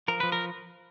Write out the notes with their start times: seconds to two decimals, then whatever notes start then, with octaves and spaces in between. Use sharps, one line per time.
0.08 F3 A#4
0.20 F3 B4
0.32 A#4